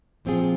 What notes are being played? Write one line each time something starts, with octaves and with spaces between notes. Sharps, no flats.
A#2 F3 C4 F4 G#4